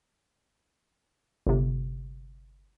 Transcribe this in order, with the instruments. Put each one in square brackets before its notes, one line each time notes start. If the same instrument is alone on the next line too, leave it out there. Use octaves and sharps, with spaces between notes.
[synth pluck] G1 C3